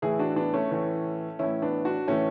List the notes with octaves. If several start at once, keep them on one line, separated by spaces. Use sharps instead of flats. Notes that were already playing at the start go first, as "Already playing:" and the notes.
A2 E3 E4 G#4
D4 F#4
B3 D4
A3 C#4
A2 E3
A2 E3 C#4 E4
B3 D4
D4 F#4
A2 E3 A3 C#4